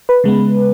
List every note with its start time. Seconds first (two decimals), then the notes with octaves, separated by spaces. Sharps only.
0.09 B4
0.24 C#3 G#3 B3